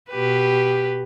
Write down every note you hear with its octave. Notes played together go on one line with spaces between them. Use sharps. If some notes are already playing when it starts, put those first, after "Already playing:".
B2 G4 B4